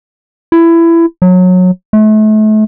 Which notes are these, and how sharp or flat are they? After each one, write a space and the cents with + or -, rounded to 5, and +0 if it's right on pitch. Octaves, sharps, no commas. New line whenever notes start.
E4 +20
F#3 -20
A3 -35